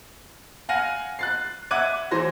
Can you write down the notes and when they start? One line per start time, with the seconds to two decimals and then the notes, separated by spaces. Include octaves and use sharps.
0.69 F5 F#5 G#5 F6 A#6 D#7
1.19 F#6 A6 C7
1.71 E5 F#5 D6 F#6 G#6 D#7
2.11 E3 C5 C6 A#6